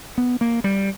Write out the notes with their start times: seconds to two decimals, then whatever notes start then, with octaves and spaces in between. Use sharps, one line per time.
0.18 B3
0.41 A#3
0.64 G3